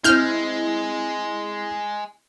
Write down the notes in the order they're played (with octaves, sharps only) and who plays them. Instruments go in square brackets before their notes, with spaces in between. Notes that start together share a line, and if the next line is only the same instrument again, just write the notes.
[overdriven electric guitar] G#3 [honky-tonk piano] C4 E4 [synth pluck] F6 G6